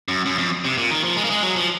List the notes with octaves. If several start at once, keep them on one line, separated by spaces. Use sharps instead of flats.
F#2
F#2
F2
C3
A#2
D#3
F3
G#3
A#3
G#3
F#3
F3